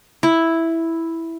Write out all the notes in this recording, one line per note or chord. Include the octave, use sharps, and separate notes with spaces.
E4